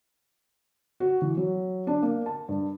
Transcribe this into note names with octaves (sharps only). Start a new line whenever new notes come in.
F#4
E3
F#3
D4
A#3
A5
G2